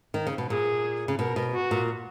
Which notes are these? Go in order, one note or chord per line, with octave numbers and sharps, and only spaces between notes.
D#3
C#3
B2
A#2 G#4
C#3
B2 A#4
B2
F#4
A#2